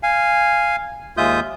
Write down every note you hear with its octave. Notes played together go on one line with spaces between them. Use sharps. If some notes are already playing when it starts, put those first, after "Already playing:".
F5 G#5
D#2 G#3 F4 E5 D#6 G6